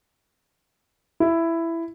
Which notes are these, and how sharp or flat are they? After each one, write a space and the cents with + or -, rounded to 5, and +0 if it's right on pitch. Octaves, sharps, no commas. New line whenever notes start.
E4 +10